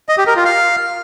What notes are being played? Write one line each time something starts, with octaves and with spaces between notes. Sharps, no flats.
D#5
G4
A#4
F4
F5